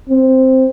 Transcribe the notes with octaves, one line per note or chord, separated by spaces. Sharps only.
C4